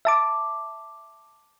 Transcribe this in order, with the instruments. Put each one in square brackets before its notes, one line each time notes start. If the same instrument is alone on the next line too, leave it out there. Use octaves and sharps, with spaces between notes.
[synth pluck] E5 A5 D6